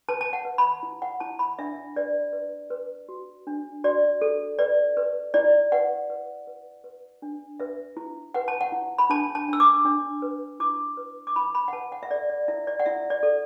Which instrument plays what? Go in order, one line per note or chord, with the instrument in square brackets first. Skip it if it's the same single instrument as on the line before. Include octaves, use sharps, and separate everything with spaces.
[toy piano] B4 A5
A5
F#5
B4
B5
E4
F#5
E4 A5
B5
D4 E5
B4 D5
B4
B4
F#4
D4
F#4 D5
A4
B4 D5
B4
E4 D5
B4 F#5
B4
B4
B4
D4
B4 E5
E4
B4 F#5
A5
F#5
E4
B5
D4 A5
A5
D4 E6
D6
D4
B4
E4 D6
B4
D6
E4 B5
B5
F#5
B4 A5
F#5
E5
A4 D5
D5
E4 E5
D5
F#5
E4 E5
D5
A4